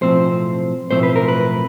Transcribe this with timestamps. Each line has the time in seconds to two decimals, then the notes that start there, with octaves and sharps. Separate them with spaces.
0.01 B1 A2 F3 A3 C4 C5
0.91 B1 A2 F3 A3 C4 C5
1.03 B4
1.16 A#4
1.28 B4